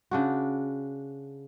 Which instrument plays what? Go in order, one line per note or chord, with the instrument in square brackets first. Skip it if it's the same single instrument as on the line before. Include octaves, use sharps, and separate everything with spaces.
[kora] C#3 D4 F#4